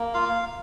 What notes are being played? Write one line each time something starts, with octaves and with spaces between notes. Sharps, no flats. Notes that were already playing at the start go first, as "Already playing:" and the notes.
Already playing: A#3
F4 F5